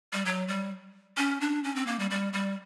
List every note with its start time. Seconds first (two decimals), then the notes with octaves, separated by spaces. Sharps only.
0.13 G3
0.25 F#3
0.48 G3
1.17 C#4
1.41 D4
1.64 C#4
1.76 C4
1.87 A#3
1.99 G3
2.10 G3
2.33 G3